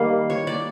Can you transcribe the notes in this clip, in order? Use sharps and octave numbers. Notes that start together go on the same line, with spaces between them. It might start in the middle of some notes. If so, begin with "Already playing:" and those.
Already playing: D#3 G3 A#3 F5
C#5
D5